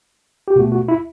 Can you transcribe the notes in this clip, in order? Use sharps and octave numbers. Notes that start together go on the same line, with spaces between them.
G4
B2 A3 F#4
F#4
E4